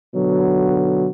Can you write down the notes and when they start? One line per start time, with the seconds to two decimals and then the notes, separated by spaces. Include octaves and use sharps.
0.15 B2 D3 F#3